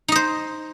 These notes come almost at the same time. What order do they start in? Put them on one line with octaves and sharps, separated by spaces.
D#4 D#5 C5